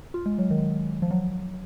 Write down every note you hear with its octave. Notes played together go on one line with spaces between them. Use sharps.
F4
G#3
F#3
D#3
F3
F#3